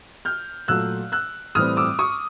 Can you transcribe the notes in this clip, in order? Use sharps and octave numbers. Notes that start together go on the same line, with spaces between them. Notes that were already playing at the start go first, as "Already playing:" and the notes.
F6 G6
A#2 F#3 A3 E6 F#6
E6 F#6
A2 E3 G3 C4 D#6 F6
D6 E6
C#6 D#6